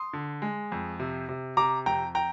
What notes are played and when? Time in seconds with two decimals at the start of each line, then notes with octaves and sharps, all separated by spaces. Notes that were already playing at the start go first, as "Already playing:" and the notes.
Already playing: C6 D#6
0.13 D3
0.42 G#3
0.72 F2
1.00 C3
1.29 C3
1.57 C3 A#5 D6
1.86 F2 G5 A#5
2.15 G5 A#5